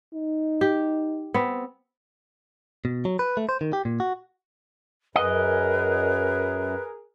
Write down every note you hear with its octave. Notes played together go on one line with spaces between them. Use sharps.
D#4
G4
B3 C4
B2
F#3
B4
A3
C5
D#3
G4
A#2
F#4
F#2 G#4 A#4 B4 D#5